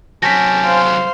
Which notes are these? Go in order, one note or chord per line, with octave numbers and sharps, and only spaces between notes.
C3 F#3 C#4 G5 A5 A#6 B6
C5 F5